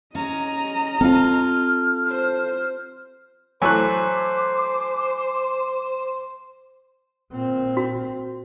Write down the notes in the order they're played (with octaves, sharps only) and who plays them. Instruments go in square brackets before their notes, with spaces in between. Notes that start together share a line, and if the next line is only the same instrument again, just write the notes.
[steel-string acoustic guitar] C#4 [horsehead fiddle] D#5 A#5
[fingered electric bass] C4 [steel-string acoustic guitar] F4 A4 [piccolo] F6
[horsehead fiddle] C5
[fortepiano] E3 F#3 A3 [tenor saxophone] C5 [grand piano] G#5 F#6 [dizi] D6
[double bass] A#2 C4
[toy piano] F#4